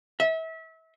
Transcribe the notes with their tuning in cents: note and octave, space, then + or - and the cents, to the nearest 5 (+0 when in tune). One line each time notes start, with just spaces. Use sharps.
E5 -30